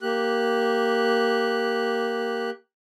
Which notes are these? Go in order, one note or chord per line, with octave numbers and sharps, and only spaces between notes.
A#3 G4 F#6